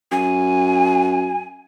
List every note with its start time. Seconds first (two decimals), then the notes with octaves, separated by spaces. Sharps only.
0.12 F#2 G#5